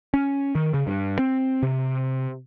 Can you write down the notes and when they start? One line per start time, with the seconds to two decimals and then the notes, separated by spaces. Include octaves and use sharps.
0.14 C#4
0.55 D#3
0.74 C#3
0.87 G2
1.19 C4
1.63 C3